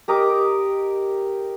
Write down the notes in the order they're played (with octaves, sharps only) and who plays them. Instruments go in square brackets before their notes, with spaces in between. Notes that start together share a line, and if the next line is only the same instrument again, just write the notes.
[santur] G4 A#4 D#5 D6